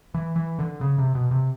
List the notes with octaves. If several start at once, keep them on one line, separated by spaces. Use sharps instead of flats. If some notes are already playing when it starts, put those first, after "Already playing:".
E3
E3
D3
C#3
C3
B2
C3